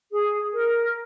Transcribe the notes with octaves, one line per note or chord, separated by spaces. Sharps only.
G#4
A#4